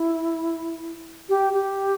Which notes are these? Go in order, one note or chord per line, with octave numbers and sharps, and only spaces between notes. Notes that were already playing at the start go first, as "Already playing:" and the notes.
Already playing: E4
G4
G4